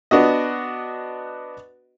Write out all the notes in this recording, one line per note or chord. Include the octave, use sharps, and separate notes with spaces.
B3 D4 F#4 D#5